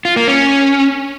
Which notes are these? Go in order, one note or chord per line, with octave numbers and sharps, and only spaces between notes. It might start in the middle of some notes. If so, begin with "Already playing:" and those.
F4
A#3
C#4